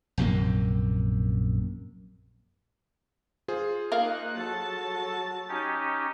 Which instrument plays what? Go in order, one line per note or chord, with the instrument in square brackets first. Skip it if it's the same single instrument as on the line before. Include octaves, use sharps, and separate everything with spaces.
[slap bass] A#1 F#2 C3 A#3
[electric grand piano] F4 G#4 C5
[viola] A#3 D#4 [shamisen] A#4 F5 [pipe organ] F#6
[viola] F#3 A5 [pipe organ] A4
[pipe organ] C#4 D#4 G4